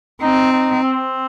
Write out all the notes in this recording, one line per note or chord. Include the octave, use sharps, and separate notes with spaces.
C4 D#4
D#4
C4